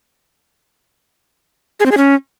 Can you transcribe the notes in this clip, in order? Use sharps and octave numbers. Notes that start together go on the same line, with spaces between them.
G#4
C4
G#4
C#4